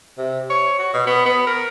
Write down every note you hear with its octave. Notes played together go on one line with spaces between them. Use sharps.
C3
C#5
F#4
B2
B3
B3
A#4